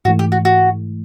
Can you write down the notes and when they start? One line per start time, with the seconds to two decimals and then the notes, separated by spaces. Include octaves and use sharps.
0.05 G#2 E3 A3 F#4
0.19 G4
0.32 F#4
0.45 F#4